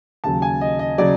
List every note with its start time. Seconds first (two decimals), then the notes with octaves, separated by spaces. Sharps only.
0.24 D#2 C#3 F#3 A5
0.42 G#5
0.61 D#5
0.79 D#5
0.98 C#3 F#3 D5